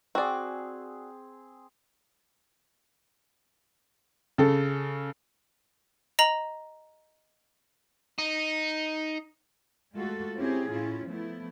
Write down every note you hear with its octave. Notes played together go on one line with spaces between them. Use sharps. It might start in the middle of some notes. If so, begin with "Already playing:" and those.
C4 F#4 G#4 D5
C#3 A4
D#5 A#5 F#7
D#4
G#3 A3 F4 F#4 A4
C4 C#4 E4 G4 G#4
A2 C#4 E4 F4
F3 A3 B3 E4